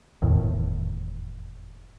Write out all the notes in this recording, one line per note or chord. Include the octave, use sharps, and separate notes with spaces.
F1 E2 A2 D#3